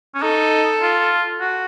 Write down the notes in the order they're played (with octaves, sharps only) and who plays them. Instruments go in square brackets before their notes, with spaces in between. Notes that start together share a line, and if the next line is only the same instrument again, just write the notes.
[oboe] C#4
[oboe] D#4 [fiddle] A4
[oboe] F4
F#4